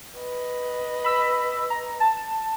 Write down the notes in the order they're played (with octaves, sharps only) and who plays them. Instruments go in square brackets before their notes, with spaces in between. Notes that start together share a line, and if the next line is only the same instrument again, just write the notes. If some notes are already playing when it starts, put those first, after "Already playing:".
[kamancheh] B4 D#5
[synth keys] B5 E6 B6
A#5
A5